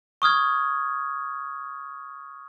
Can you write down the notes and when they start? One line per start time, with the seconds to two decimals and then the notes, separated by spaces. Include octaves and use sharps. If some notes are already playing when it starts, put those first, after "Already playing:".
0.22 C#6 D#6 F6 G#6